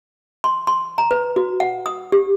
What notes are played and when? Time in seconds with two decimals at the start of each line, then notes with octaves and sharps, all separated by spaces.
0.44 C6
0.67 C6
0.98 A#5
1.11 B4
1.36 F#4
1.60 F#5
1.86 D#6
2.12 G4